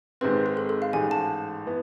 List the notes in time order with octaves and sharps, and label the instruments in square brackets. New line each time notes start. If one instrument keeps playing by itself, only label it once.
[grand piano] G#1 G#2 G#3 C4 [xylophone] B4
[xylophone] G#4
A4
A4
F5
[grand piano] A1 G#2 G#3 [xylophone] G#5
[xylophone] A5
[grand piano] E3 B3